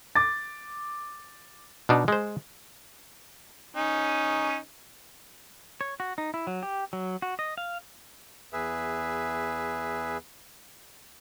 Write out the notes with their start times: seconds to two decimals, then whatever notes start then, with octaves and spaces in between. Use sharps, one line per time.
0.15 D6 A6
1.89 B2 D4 D#4
2.08 G#3 C5
3.76 C#4 D#4
5.81 C#5
6.00 F#4
6.18 D#4
6.34 E4
6.47 F#3
6.63 G4
6.93 F#3
7.22 F#4
7.39 D#5
7.58 F5
8.53 E2 G#4 B4 E5